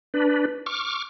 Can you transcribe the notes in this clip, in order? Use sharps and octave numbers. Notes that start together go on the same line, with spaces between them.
D4 B4
C#6 D6 F6